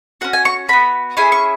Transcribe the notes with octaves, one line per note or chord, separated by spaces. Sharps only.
C#4 F#4 F#5
G#5
C#6
B3 F#4 B5
C#4 E4 G#4 G#5
C#6